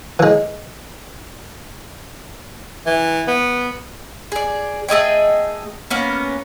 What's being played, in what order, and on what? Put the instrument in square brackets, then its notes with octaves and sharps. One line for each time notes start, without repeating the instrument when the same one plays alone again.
[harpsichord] E3 G#3
[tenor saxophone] E3
B3
[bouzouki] G#4 D5
A3 G#4 D#5 G5
A#3 B3 C#4